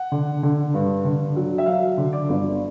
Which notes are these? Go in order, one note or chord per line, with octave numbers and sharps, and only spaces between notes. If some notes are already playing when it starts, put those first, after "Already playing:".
Already playing: F#5
D3
D3
G2
D3
F#3
E5
F#3 F5
D3
D5
G1